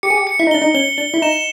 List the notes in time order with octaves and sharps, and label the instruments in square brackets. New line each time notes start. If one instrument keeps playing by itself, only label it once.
[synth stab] G4 [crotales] C#7
[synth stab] G#4
G4
[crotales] C#7
[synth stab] E4
D#4
[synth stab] D4 [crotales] G7
[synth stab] D#4
[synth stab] C#4 [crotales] G7
[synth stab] D4 [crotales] G7
[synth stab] E4
[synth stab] D#4 [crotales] E7